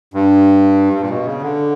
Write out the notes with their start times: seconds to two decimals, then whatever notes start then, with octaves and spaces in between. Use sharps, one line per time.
0.14 G2
0.93 G2
1.01 A#2
1.10 B2
1.25 C#3
1.42 D3